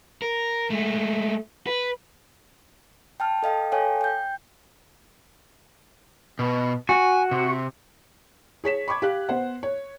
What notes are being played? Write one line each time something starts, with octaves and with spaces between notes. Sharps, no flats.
A#4
G#3 A3
B4
G5 A5 F6
A4 D#5 F5 G5
A4 C#5 F5 G5 G#5
G5 G6
B2
F#4 G#5
C3
G#4 C#5 B6 E7
B5 C#6 D6 G#6
G4 F5 F#6
B3 C5 F#5
C#5